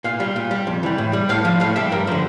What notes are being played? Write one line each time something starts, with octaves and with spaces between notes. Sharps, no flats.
A#2 F5
G3
A#2
G3
F2
E3 G3
A2
G3
A2 F5
F3
A2 F5
G3 E5
G2 A#4
D3 F3 C5